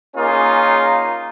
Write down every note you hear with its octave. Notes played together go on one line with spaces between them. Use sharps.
A#3 C#4 D#4 F4 G#4